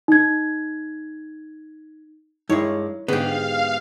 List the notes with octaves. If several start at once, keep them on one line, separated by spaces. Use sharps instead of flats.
D#4 G#6
G2 G#3 D#4 E4 C#5
G#2 D3 B3 G4 F5